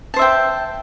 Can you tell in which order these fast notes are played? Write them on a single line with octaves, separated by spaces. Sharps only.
A5 C5 E5 G5